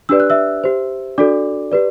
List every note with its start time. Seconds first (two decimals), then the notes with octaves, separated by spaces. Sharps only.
0.09 D4 G4 B4 D5 E6
0.20 F#6
0.30 E5 E6
0.64 G4 C5
1.18 D4 F#4 A4 D5 D6
1.72 G4 B4 D5